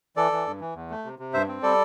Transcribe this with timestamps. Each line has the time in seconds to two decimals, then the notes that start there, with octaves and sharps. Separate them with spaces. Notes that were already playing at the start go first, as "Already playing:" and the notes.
0.17 E3 A4 D5
0.32 E3
0.47 G2
0.60 E3
0.75 E2
0.90 A3
1.05 C3
1.19 C3
1.34 G2 C5 E5
1.48 C4
1.63 G3 A4 D5